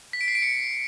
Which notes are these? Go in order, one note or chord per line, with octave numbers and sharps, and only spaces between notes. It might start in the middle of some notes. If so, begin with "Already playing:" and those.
B6
D7
C7
D7
C#7